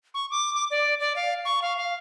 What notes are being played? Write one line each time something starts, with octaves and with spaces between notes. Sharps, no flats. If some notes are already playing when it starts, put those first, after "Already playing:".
C#6
D6
D6
D5
D5
F5
C#6
F5
F5